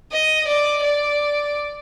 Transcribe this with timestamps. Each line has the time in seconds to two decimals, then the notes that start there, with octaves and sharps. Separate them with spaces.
0.12 D#5
0.47 D5
0.83 D5